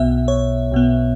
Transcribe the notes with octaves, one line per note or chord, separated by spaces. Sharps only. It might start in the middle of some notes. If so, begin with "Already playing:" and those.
Already playing: B1 B2 B3 E5
C#5
B1 B2 B3